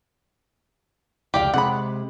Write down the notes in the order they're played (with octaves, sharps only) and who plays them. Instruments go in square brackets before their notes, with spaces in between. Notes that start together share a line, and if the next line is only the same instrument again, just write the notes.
[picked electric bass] F1 C#2 [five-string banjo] G4 D5 F5
[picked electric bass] C3 G#3 [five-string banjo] F#5 B5